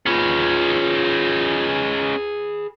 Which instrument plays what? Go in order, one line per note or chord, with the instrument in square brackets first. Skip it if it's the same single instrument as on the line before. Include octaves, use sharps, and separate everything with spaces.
[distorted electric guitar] C#4 D#4 [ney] F4 [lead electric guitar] G#4 B4